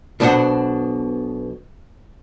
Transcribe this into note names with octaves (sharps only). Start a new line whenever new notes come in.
B1 B2 D4 G#4 C5 F#5